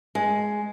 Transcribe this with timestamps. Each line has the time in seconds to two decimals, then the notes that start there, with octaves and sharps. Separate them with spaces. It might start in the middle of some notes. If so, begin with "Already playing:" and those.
0.15 G#3